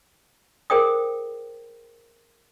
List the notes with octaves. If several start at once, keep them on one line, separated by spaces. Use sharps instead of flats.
G#4 A#4 C5 G5 D#6